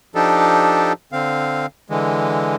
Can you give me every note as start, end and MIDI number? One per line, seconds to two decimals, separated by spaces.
0.15 0.93 53
0.15 0.93 62
0.15 0.93 63
0.15 0.93 67
0.15 0.93 69
1.12 1.66 50
1.12 1.66 60
1.12 1.66 77
1.90 2.56 50
1.90 2.56 52
1.90 2.56 56